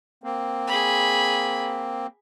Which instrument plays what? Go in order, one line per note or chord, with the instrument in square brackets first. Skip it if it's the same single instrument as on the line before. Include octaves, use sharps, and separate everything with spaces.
[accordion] A#3 C4
[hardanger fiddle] G#4 B5